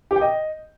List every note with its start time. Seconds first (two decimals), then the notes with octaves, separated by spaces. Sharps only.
0.11 G4
0.16 G5
0.21 D#5